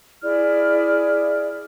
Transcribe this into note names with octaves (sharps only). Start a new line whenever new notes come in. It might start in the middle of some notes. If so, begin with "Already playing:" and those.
E4 G#4 D5 F6